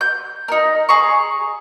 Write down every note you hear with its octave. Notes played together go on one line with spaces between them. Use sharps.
G6
D#4 A#4
G#4 A#5 C#6